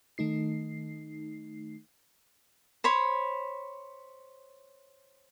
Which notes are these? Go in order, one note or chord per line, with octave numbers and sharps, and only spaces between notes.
D#3 A3 D#4 C7
C5 C#5 B5